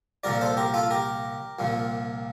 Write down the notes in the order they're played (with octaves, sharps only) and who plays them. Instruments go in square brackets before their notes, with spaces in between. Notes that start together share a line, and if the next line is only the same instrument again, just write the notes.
[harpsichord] C2 A#2 F3 A#4 D5
A4 C5
G4 A#4
F4 A4
G4 A#4
C2 A#2 F3